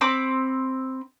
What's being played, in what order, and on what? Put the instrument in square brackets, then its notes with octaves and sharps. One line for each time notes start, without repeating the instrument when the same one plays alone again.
[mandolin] C4 B5 D6